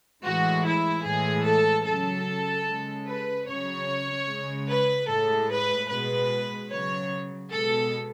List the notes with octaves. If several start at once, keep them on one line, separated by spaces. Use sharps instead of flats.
A2 E3 G#3 F#4
E4
A2 E3 G#3 G#4
A4
C#3 F#3 A4
C#3 G#3
B4
C#3 F#3 C#5
C#3 G#3
B4
A2 G#3 A4
B4
B2 G#3 B4
C#3 F#3 C#5
B2 G#3 A4